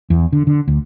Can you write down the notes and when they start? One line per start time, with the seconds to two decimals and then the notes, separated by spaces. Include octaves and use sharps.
0.10 E2
0.32 D3
0.47 D3
0.68 D2